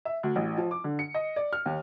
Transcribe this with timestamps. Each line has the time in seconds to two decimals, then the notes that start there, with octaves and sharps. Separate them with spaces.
0.05 E5
0.23 D2
0.36 A1
0.58 F3
0.71 D6
0.84 D3
0.99 C#7
1.14 D#5
1.36 D5
1.53 F6
1.66 D#2